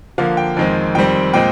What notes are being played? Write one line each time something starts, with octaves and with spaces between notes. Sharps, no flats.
D3 F3 A#3 F5
G5
F2 D#3 G#3 C4
F2 D#3 G3 C4 G5
A#2 G#3 C4 G5